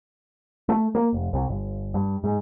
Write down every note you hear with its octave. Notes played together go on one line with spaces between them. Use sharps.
A3
A#3
F1
C2
G1
G2
G#2